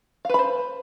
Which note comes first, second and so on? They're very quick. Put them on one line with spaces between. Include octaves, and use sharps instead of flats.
F5 B4 B5 C5